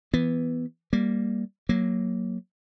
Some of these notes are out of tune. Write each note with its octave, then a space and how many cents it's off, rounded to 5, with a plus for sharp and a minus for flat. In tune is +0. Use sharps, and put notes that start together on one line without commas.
E3 +0 B3 +0
G3 +0 A#3 +0
F#3 +0 A#3 +0